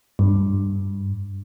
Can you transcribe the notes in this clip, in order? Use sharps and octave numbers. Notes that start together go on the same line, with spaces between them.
G2